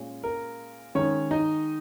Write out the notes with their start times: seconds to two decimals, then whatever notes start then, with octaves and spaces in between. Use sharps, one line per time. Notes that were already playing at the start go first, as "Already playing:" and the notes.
Already playing: A#2 G#3 C#4
0.24 A#4
0.95 D#3 G#3 C#4 D#4 C#5
1.31 D#4 D#5